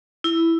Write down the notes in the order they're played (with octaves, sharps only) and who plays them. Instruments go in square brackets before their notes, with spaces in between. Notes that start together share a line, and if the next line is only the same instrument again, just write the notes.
[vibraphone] E4